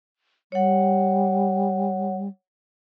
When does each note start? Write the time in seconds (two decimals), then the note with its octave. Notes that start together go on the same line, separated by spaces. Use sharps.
0.52 G3 C#5 F#5